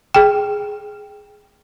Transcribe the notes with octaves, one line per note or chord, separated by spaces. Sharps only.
G#4 G5